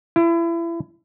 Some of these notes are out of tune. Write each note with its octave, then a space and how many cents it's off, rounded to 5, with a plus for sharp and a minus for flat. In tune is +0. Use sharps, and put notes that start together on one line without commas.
E4 +30